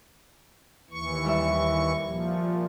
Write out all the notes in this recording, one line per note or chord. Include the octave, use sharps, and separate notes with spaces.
D#2 E3 C#6
G3 A#4 E5
A#2 F3